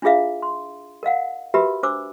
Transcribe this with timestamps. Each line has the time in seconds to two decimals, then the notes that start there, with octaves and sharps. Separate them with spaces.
0.02 D4 E4 F4 G#4 E5 F5
0.42 C6
1.03 A#4 D#5 F5 F#5
1.54 F#4 G4 A#4 B4 E5 B5
1.83 D4 C5 D6 E6